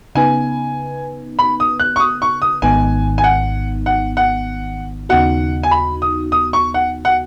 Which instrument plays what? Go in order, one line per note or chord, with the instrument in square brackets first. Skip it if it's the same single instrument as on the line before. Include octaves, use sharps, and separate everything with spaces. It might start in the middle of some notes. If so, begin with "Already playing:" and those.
[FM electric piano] C#3 B3 D#4 B4 [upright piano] G#5
[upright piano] B5
D#6
F#6
C#6
D#6
C#6
D#6
[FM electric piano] G#1 G#2 D#3 B3 D#4 [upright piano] G#5
[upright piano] G#5
F#5
F#5
F#5
[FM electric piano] D#2 C#3 B3 D#4 F#4 [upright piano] F#5
[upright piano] G#5
B5
D#6
D#6
C#6
F#5
F#5